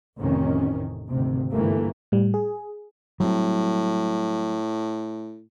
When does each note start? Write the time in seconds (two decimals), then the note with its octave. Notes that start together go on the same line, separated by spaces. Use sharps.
0.17 A1 F2 C3 D#3 C#4
1.09 G#1 D2 C3
1.52 G1 G2 E3 A3 A#3
2.12 A2 G3
2.34 G#4
3.20 A2 F#3 G3 C4